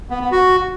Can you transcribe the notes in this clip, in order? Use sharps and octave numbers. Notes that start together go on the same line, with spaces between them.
B3
B3
F#4